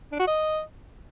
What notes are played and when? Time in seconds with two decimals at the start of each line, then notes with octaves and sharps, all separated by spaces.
0.12 D4
0.20 F#4
0.27 D#5